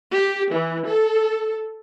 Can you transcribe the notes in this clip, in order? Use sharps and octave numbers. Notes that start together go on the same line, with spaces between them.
G4
E3
A4